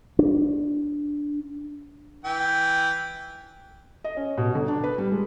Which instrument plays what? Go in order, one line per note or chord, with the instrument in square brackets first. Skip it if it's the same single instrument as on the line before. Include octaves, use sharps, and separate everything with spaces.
[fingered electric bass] D4
[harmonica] E3 G5
[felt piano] D#5
C#4
B2
G1
D4
B4
G3
G#3